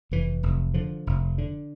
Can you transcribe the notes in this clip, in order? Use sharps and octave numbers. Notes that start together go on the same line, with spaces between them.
F1 E3
F1
D3 F3
F1
D3